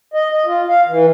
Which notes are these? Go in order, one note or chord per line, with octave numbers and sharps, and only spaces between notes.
D#5
D#5
F4
F5
E3